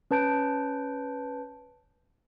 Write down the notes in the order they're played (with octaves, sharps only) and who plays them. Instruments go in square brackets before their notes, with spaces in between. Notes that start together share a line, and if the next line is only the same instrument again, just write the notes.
[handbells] C#4 B4 A5 G6 D7